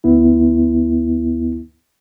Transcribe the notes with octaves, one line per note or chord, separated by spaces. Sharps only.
D2 B3 E4